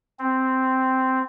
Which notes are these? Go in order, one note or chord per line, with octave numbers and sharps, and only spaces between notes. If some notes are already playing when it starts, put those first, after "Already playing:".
C4